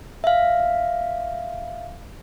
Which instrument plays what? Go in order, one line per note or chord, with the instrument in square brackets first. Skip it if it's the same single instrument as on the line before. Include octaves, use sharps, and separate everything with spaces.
[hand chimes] E5 F5